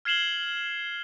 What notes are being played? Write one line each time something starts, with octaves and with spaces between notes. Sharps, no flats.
F6 G#6 C7 E7 F#7 G7